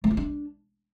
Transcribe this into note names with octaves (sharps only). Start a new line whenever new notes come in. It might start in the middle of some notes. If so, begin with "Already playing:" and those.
A3
F4
D4